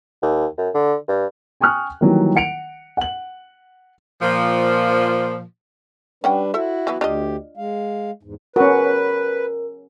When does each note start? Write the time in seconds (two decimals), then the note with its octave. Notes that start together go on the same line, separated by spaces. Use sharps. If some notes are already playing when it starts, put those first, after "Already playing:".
0.22 D#2
0.58 F#2
0.75 D3
1.08 G2
1.61 G5 G#5 C#6 D#6 F6 F#6
2.01 D#3 E3 F#3 G3 A#3
2.36 F#5 C#7 D7 F7
2.97 F#5 F#7
4.22 A#2 F3
6.24 G3 C#4 D4 B4 F#5 G5
6.54 E4 F#4 A4 C5 E5
6.87 E3 F#3 B3
7.01 D2 D4 F4 G4 D#5
7.57 G#3 F5
8.23 E2 G#2
8.56 C#4 F#4 A#4 B4